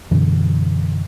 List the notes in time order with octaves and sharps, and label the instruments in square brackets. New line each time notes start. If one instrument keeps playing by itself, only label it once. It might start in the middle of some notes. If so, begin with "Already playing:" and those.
[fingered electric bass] F#2 B2 D3 E3